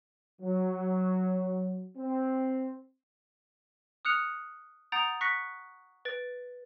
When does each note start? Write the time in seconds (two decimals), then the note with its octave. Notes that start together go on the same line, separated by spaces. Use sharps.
0.42 F#3
1.97 C4
4.05 D#6 F6 F#6 C#7 F7
4.92 F#5 A#5 D#6 G6 A6 D7
5.21 C#6 F#6 A#6 B6 C#7
6.05 B4 A6 D7